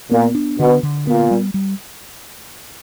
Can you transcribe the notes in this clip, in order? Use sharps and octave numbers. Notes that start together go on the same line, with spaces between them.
A#2 B3
D4
B2 D3
D3
A#2 B3
G3
G3